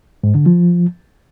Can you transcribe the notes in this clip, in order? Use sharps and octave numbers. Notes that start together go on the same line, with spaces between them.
G#2
D3
F3